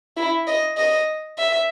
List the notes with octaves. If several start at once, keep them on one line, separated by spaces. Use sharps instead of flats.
E4
D#5
D#5
E5